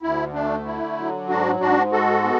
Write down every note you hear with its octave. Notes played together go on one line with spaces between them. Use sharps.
D2 E4
A3 D4
D3 E4
F#3
G#2 D4 F#4
G#2 D4 F#4
G#3 F#4 A4
B3